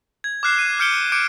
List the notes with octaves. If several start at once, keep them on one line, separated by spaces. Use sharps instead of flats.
G#6
D6 F6 F#6 C7 E7
F#6 D#7
F6 G6 C#7 D7 G7
D6 G6 C#7 D7